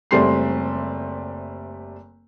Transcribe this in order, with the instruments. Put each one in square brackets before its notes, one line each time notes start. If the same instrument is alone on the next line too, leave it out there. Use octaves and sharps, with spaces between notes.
[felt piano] F#1 G3 A3 C4 C6 C7